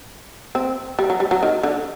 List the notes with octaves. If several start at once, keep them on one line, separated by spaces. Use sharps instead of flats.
C4
G3
F#3
G3
F#3
D#3
D3